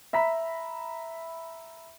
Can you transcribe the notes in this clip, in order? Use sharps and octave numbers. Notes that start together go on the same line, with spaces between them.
E5 A#5 B5 B6